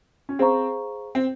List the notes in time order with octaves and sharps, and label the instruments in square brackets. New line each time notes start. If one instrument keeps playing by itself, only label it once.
[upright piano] C#4
[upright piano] C4 [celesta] G#4 C5 F5 A#5 C#6
[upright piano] C4